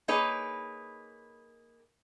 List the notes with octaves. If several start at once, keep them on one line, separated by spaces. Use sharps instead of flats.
A#3 D#4 G#4 B4 C#5